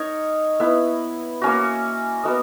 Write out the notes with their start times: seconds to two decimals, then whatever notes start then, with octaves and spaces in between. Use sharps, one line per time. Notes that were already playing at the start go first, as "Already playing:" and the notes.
Already playing: D#4 A#4 C#5
0.60 B3 E4 B4
1.42 A#3 C#4 F#4
2.24 B3 F#4 A#4 D#5